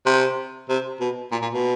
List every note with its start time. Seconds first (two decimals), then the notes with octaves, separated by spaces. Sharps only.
0.06 C3
0.69 C3
1.00 B2
1.32 A#2
1.42 A#2
1.53 B2